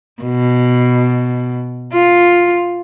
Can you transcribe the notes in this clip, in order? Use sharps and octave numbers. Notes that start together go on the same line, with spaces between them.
B2
F4